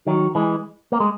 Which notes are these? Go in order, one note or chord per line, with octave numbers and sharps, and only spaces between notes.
D#3 F#3
E3 G#3
A#3
G#3